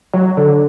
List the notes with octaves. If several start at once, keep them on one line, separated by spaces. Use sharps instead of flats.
F#3
D3